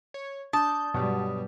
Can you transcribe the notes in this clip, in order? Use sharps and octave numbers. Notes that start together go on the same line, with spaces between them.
C#5
D4 A5 D#6 G6
G2 B2 F#3 G3